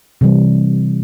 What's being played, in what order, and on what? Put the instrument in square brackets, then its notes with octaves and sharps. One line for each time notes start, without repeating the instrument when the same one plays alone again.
[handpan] C3 E3 G3